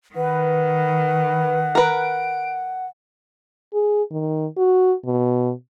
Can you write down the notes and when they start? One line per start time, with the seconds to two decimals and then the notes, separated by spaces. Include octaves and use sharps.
0.15 D#3 B4 F#5
1.75 A#4 B4 D7
3.74 G#4
4.11 D#3
4.57 F#4
5.06 B2